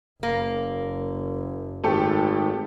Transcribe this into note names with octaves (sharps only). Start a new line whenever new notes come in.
F#1 A#3
G#1 A3 G4 A4